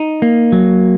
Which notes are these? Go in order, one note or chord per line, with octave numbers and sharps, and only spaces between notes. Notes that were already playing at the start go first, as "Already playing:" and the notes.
Already playing: D#4
A#3
F#3